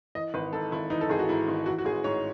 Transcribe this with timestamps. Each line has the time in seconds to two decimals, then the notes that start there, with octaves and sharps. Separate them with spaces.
0.15 E3 D#5
0.34 G#1 B4
0.53 G#2 A4
0.72 G#1 E4
0.90 E3 D#4
1.01 A4
1.09 G#1 G#4
1.19 F#4
1.29 G#2 E4
1.48 G#1
1.66 E3 F#4
1.78 F#4
1.85 A1 G#4
2.04 G#2 C#5